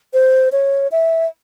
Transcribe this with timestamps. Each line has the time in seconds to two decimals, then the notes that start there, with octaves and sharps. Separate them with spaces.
0.13 C5
0.52 C#5
0.92 E5